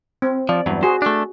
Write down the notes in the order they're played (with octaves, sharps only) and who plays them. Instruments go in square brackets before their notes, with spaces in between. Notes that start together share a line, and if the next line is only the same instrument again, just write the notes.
[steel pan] C4
[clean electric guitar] F3 [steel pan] D5
[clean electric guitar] E2 G2 F#3
[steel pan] F#4 G#4 [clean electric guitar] C5
[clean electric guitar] A3 D4